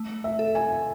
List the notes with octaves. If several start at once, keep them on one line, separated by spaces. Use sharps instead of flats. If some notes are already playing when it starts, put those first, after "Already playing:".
Already playing: A3
E5
A4
G#5